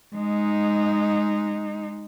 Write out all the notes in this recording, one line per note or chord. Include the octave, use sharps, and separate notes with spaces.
G#3 D#4